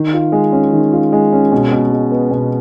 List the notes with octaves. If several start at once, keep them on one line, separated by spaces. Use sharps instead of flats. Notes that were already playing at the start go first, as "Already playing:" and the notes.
Already playing: D#3
F4
G#3
C#4
D#3
F4
G#3
C#4
B2
B2
G#3
B3
B2